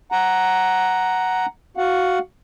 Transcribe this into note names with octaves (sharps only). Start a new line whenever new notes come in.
F#5 A#5
F#4 F5 F#5